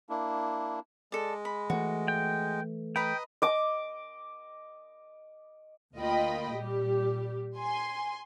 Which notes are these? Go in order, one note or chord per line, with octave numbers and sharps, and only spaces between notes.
A#3 D4 E4
G#3 A4 D5
B5
E3 A3 F#4
G5
B4 D#5 G5 A#5 B5
D#5 D6
D2 A#3 F4 D#5 G5 B5
A#2 G3 G4
G#5 C6